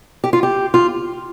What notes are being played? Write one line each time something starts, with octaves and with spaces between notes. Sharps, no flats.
G4
F4
G4
F4